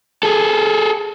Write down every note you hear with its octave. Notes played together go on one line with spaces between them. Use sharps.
G#4 A4